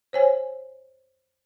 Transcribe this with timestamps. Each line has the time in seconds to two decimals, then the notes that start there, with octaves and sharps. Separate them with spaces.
0.13 C5 C#5 G#5